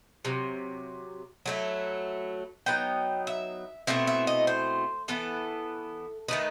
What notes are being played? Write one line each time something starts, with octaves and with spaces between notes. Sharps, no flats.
C3 F#3
F#3 A3 E4
F#3 B3 D#4 G5
E5
B2 A3 C4 E4 E5
E5
D#5
C5
E3 B3 E4 A4
D#3 A3 D#4 B4